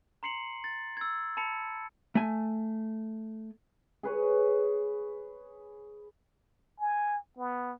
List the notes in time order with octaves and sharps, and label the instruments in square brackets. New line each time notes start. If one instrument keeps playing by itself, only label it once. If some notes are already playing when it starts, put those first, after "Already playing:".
[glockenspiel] A#5 C6 C7 C#7 F#7
A6
E6 G#6
A5 B5 C#7
[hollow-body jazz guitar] A3 G#5
[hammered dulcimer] G#4 B4 C#5
[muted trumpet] G#5
B3